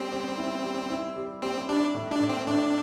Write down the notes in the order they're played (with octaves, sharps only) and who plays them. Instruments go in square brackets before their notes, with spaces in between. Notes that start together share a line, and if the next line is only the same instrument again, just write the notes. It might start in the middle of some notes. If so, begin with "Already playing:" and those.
Already playing: [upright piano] G3 [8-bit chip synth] C4
[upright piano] G3
E4
G3
E4
G3
[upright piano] G3 [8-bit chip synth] C4
[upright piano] G3 [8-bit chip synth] D4
[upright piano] A2
[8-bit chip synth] D4
[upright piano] A2
[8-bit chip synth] C4
[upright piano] A2 [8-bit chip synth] D4